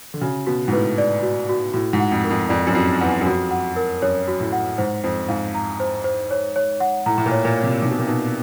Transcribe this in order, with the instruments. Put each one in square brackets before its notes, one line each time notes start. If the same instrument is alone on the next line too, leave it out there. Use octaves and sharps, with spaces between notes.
[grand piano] D3
[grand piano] C#3 [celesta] F#4
[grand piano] B2 [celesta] F#4
[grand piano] G#2
[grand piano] A2 [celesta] B4
[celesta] D5
F#4
F#4
[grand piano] A2 [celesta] F#4
[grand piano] G#2
[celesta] F#5
[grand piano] F2
[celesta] A#4
[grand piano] F2
[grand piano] F2 [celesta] D5
[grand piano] F#2
[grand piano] F2 [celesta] F#4
[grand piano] E2 [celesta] F#5
[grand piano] F#2
[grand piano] F2 [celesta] F#4
[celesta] F#5
A#4
[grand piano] F#2 [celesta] C#5
[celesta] F#4
[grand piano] A2
[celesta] F#5
[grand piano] G#2 [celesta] C5
[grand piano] F2 [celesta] C5
[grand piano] G#2 [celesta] F5
[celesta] A#5
C5
C5
C#5
C#5
F#5
[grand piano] A2 [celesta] A#5
[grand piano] A2
A#2
[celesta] C#5
[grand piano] A#2
[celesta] C#5
[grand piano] C3
[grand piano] C3 [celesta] D#4
[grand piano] B2
A#2
[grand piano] B2 [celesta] D#4